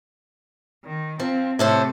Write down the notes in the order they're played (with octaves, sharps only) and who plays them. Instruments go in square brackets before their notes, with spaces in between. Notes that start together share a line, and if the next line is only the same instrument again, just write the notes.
[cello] D#3
[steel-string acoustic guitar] F3 [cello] C4
[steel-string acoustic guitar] A2 A4 C5 [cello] C3 A3